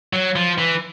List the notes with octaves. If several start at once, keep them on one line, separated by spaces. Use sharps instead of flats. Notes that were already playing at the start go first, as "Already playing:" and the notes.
F#3
F3
E3